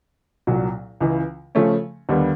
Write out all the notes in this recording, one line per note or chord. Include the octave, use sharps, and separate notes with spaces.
C2 A#2 F#3
C#2 C#3 E3
C#3 F3 A3 C#4
D#2 D3 G3 B3